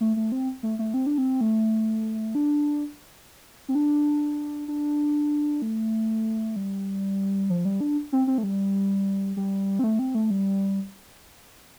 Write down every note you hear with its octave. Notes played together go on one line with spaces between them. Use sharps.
A3
A3
C4
A3
A3
C4
D4
C4
A3
D4
C4
D4
D4
A3
G3
F3
G3
D4
C4
C4
A3
G3
G3
C4
A3
C4
A3
G3